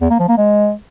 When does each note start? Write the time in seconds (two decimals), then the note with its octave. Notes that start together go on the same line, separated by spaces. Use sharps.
0.01 E2
0.10 A#3
0.19 F3
0.28 A#3
0.37 G#3